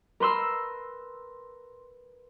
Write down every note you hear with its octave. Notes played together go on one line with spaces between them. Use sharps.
A#4 B4 C6 E6